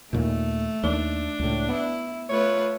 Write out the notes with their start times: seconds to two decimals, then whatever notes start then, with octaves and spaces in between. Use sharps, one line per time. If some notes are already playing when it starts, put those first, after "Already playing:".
0.13 D#2 A#2 A3
0.84 D#2 D4
1.39 C#2 A2
1.69 B3 E4
2.29 A3 F4 B4 C#5